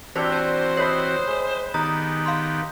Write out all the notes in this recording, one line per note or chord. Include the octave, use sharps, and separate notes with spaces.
E3 C4 D4 F#4 G4 C5 D5 E6
C5 A5
B4 C#5 D#5 E5
G#3
D#3 B3 D#4 G4 A#5
F5 C6